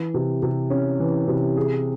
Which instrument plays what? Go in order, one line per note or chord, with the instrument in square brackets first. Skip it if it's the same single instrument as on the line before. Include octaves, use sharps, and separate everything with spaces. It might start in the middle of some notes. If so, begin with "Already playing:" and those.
Already playing: [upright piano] E3
C3
C3
C#4
E3
C3
G#4